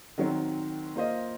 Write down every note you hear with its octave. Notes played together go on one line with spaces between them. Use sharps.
D#3 F#3 C4
A#3 F4 C5 D#5